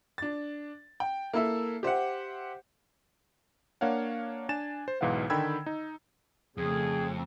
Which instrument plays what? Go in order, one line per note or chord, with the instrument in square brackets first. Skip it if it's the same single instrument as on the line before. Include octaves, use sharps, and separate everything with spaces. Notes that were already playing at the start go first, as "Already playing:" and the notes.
[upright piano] D4 A6
G5
A#3 E4 A4 E5
G4 C5 E5 F#5
[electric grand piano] A#3 D4 C#5 F5 F#5
D4 G#5 A6 E7
C5
B1 G#2 E3 B4 F5 F#5
D3 D#3 G5 B5 E6 G#6
D#4
[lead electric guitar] F2 [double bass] C#3 A3 [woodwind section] G#4